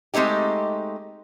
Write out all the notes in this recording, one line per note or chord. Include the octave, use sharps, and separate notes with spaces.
G#3 A3 C4 D#4 G4